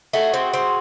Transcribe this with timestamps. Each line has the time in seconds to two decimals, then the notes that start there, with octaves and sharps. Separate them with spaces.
0.13 A3 F#4 G#4
0.34 C4
0.54 C4